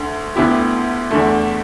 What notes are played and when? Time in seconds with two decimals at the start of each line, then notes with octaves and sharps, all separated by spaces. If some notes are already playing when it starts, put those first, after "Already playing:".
Already playing: D2 D3 A3
0.36 D2 D3 B3 E4 G4
1.11 E2 D3 A3